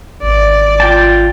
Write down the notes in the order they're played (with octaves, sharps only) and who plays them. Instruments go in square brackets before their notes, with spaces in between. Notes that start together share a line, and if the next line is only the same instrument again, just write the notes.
[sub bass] G#1 [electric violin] D5
[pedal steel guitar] F4 G5 A5